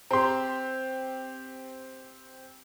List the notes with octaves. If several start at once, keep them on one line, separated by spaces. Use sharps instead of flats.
C4 G4 A#5 C6